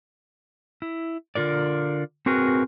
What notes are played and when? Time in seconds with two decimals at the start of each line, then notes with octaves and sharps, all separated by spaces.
0.82 E4
1.35 D3 F4 A#4 D5
2.26 C4 F#4 G#4 A#4 B4